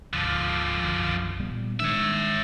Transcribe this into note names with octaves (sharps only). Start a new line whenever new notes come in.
D2 G#2 D3 F3
B1 F#2 D#3
A#2 G3 B3
D#3 G#3 D4 C#5 E5